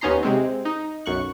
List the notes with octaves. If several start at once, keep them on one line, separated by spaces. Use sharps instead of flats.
D#2 B3 C#4 D#4 A#5 C6
C3 G#3 C4
D#4
B1 F#2 C#6 F#6